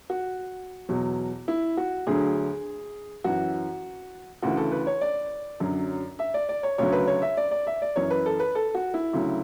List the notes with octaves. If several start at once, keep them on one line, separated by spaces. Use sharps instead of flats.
F#4
E2 B2 F#3
E4
F#4
D2 D3 F#3 G#4
F#2 E3 F#4
D2 C#3 E3 F#4
A4
B4
C#5
D5
F#2 D3 F#3
E5
D5
D5
C#5
D2 C#3 F#3 C#5
B4
C#5
E5
D5
D5
E5
D5
F#2 E3 C#5
B4
A4
B4
A4
F#4
E4
D2 C#3 F#3